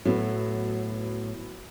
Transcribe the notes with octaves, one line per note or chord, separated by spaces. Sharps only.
A2 F#3 B3